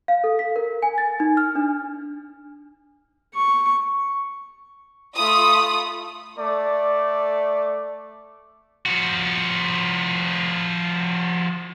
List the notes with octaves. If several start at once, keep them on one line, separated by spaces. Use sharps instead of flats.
F5
A4
B6
A#4
G#5
A6
D#4
F6
D4
C#6
A3 F4 B5 D#6
A3 D5
F3 F#4